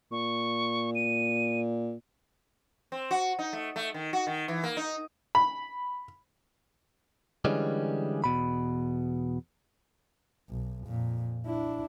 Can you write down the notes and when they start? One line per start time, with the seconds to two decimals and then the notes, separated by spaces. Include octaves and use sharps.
0.12 A#2 C#6
0.95 D#7
2.92 C4
3.11 F#4
3.39 D#4
3.53 A3
3.76 A3
3.94 D#3
4.13 F#4
4.27 D#3
4.48 E3
4.64 A#3
4.77 D#4
5.35 B5
7.45 D3 E3 G3 G#3 C#4
8.24 E2 B2 B5
10.50 B1
10.87 F2 A#2
11.47 D4 E4